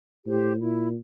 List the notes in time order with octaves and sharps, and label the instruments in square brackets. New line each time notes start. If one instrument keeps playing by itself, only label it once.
[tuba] A2 [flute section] G4 C5
[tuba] A#2 [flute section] E4